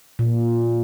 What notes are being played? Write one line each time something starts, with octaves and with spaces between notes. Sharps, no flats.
A#2